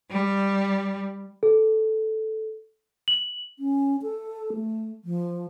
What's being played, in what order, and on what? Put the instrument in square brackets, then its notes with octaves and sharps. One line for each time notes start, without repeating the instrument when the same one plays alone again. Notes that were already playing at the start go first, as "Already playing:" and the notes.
[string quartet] G3
[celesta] A4
F#7
[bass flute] C#4
A4
A3
F3